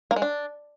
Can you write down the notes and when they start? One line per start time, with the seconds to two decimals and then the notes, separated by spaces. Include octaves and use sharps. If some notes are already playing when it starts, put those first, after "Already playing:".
0.11 A#3
0.16 G#3
0.22 D4